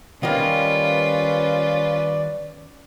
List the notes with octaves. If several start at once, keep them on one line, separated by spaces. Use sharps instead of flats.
D#3 G3 A#3 C#4 F4 B4 D5